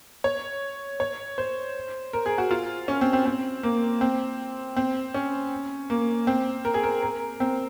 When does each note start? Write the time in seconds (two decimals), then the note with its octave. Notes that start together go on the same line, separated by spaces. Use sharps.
0.24 C#5
1.00 C#5
1.38 C5
2.13 A#4
2.26 G#4
2.38 F#4
2.51 F4
2.88 C#4
3.01 C4
3.13 C4
3.26 C4
3.63 A#3
4.01 C4
4.77 C4
5.14 C#4
5.90 A#3
6.27 C4
6.65 A#4
6.74 G#4
6.84 A#4
7.02 A#4
7.40 C4